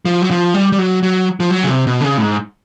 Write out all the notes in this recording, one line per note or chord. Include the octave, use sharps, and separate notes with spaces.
F3
F#3
F3
G3
G3
F#3
F#3
F3
F#3
C#3
C3
B2
D3
C#3
A2
G#2